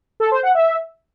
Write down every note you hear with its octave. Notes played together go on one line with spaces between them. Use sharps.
A4
C5
F#5
E5